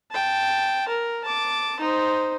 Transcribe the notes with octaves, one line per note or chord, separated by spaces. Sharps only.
G5 A5
A#4
A5 D6
D#4 C5